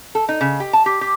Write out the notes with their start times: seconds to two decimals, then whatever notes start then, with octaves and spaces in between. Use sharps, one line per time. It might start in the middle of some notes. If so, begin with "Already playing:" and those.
0.15 A4
0.29 D#4
0.41 C#3
0.60 G4
0.73 A5
0.86 G4
1.01 G4